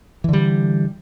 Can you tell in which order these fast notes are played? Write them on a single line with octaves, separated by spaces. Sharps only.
E3 D3 G3